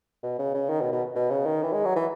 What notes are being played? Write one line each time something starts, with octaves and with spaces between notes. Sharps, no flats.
B2
C#3
C#3
D#3
B2
B2
B2
C#3
D#3
E3
G#3
F#3
E3